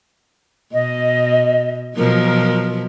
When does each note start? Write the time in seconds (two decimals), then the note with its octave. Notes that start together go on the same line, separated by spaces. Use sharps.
0.72 B2 D#5
1.96 B2 F3 F#3 A#4